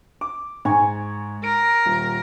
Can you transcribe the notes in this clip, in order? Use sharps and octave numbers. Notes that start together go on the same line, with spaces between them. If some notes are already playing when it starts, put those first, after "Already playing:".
D6
G#2 G#5 C#6 G#6
A#4 D7
D#1